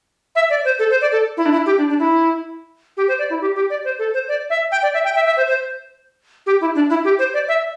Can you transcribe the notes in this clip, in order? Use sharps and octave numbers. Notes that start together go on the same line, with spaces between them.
E5
D5
C5
A4
C5
D5
A4
E4
D4
E4
G4
D4
D4
E4
G4
C5
D5
E4
G4
G4
D5
C5
A4
C5
D5
E5
G5
D5
E5
G5
E5
E5
C5
C5
G4
E4
D4
E4
G4
C5
D5
E5